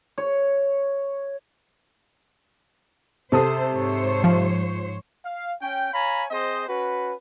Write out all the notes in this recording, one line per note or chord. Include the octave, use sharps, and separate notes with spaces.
C#5
C3 A4 C5 D#6
G#2 C5 C#5
F3
F5
C#4 G5
C#5 F5 G#5 A#5 B5
C4 G#4 C5 D#5
C#4 F#4 B4